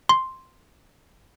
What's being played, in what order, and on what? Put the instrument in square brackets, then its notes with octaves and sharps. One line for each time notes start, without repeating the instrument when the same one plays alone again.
[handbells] C6